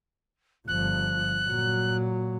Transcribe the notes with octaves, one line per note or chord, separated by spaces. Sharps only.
G1 F3 F#6
A#2 F#3